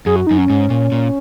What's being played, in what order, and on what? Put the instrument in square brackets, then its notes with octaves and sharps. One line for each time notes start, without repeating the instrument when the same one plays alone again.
[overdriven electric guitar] F#2 [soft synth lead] G#4
[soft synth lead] F#4
[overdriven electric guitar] F#2 [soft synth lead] D#4
[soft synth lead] C#4
[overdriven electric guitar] G#2
A#2
A#2